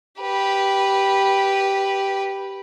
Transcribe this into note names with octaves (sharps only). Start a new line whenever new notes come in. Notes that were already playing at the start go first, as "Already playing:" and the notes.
G4 B4